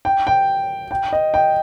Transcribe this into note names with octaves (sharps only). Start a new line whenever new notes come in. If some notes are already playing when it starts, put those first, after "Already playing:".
G5
G5
G5
D#5
G5